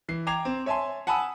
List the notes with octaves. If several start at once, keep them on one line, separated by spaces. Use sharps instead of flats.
E3 C7
G5 A#5 D6 G#6 C7 F7
C4
C#5 E5 G#5 A5 C6
F#5 G#5 A5 B5 D#6 E6